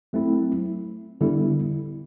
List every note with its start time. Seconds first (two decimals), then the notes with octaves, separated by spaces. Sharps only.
0.13 F#3 A3 C4 E4
1.21 D3 G3 B3 E4